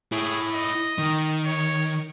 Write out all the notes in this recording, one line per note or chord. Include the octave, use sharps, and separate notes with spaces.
E4 G#4 C#5
D#5
D#3
C#5